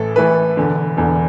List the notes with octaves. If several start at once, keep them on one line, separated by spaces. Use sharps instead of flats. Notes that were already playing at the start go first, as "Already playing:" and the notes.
Already playing: A1 A2 E3 A3 A4
A1 A2 E3 A3 B4
E1 E2 D3
E1 E2 D3